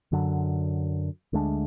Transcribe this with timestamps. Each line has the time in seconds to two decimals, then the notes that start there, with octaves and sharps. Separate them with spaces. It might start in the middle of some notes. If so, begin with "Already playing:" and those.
0.12 F#2 D3 F#3
1.33 D2 D3 G#3 D4